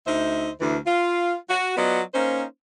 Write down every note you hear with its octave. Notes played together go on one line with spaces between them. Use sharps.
D2 D#4 C5 E5
D2 E3
F4
F#4
F#3 B3 F4 D5 D#5
A#3 C#4 D#4 C5